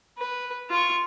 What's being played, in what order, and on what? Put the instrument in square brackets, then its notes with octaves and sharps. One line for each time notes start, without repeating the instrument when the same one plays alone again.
[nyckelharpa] B4
F4 C#6